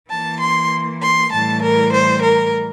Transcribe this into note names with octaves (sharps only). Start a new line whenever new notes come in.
E3 A#3 A5
C6
C6
A2 E3 G3 A5
A#4
C5
A#4